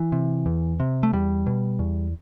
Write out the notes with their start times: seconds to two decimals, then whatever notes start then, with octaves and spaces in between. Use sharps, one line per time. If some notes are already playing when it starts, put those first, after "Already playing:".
Already playing: E3
0.12 C3
0.46 E2
0.80 C3
1.03 A3
1.13 E2 G3
1.47 B2
1.79 E2